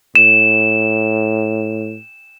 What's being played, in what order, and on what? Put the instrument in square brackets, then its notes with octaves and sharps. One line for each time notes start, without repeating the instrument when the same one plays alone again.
[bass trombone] A2 [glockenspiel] E7